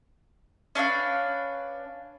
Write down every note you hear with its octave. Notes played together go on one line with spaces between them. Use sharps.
C#4 D4 B4 F5